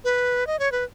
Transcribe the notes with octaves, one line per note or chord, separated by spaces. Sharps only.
B4
D#5
C#5
B4